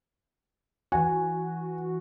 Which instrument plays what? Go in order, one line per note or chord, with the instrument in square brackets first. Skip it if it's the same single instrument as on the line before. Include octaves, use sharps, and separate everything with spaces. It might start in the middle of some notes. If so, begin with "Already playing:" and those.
[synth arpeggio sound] E3 F#4 [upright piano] G#5